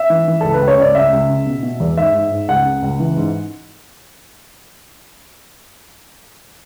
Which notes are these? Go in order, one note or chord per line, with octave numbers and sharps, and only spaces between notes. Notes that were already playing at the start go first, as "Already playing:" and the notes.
Already playing: E5
E3
E3
C#2 A4
B4
C#2
C#5
C#2 D5
C#2 E5
C#2
C#3
B2
B2
E2
G#2 E5
G#2
G#2
C#2 F#5
C#3
C#2
E3
G#2